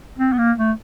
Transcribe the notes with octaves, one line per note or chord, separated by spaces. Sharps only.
C4
B3
A#3
A3